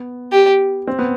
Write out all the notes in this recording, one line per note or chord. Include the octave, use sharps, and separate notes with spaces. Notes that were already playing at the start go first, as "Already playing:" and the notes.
Already playing: B3
G4
C4
B3